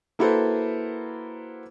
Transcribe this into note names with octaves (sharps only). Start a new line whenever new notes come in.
A#3 E4 F#4 A4 B4 C5